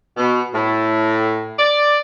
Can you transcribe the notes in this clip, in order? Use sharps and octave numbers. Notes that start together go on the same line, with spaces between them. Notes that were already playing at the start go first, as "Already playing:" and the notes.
B2
A2
D5